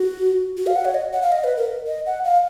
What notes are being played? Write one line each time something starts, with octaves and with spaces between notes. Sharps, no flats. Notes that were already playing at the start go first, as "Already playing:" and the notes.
Already playing: F#4
F#4
F5
F#5
C#5
D#5
F#5
F5
D#5
B4
A#4
D#5
F#5
F5